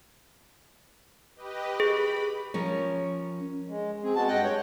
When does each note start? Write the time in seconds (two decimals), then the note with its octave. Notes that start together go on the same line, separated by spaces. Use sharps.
1.35 G4 B4 D#5
1.80 G#4 B5
2.54 F3 C#4 A#4 C#5
3.68 G#3
4.03 C4 G#4
4.15 G#3 B3 F#4 A5
4.28 G2 D#5 F#5 G5
4.44 C#5